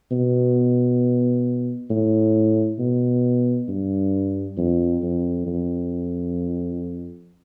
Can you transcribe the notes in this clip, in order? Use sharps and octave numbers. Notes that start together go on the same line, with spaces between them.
B2
A2
B2
G2
F2
F2
F2